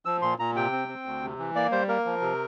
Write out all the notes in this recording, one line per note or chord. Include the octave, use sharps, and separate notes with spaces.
F3 E6
A#2 C6
A#2 A#5
C3 G5
C4
C4
D2
C3
E3
A#3 D5
G3 C5
A#3 A#4
F3
C3